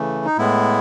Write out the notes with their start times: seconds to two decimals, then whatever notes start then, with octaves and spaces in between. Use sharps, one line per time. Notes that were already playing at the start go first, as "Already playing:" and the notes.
Already playing: C#3 E3 A3
0.25 D#4
0.37 A2 G#3 B3 E4